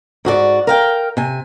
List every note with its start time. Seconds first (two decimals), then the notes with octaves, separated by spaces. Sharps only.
0.25 G#2 F#4 G#4 D5
0.67 A#4 F5 G5
1.17 C3 G#5